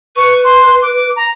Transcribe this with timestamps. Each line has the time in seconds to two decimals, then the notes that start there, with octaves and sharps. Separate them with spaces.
0.16 B4 C#6
0.44 C6
0.82 D6
1.16 A#5